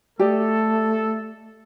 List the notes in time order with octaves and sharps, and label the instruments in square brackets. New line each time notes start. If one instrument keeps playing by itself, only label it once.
[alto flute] A3 [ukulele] G4 D5 D#5 [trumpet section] A4